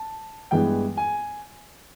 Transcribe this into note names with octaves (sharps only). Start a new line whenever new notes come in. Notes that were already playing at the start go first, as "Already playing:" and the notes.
Already playing: A5
G2 E3 G#3 B3 G5
G#5